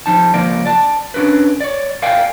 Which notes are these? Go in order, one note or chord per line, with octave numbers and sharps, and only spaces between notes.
F3 D#4 A5
C#2 F3 A#3 A#4 D5
D5 A5
C#4 D4 F4 A#4 B4
C#5 D5
A#4 D5 F5 G5 G#5